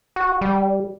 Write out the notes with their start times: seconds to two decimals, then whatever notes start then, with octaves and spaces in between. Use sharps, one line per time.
0.16 F#4
0.41 G3